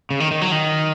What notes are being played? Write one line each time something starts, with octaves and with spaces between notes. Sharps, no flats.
C#3
D#3
D#3
F#3
D#3